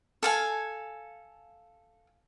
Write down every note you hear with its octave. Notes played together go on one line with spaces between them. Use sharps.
A4 F5 G#5